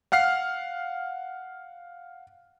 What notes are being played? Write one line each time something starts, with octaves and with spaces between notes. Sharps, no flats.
F5 F#5 F6 C7